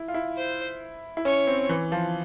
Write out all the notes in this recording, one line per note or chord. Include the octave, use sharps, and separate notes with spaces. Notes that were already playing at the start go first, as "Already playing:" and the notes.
Already playing: E4
F4
E4
C5
E4
C#4 C#5
C4
E3
F3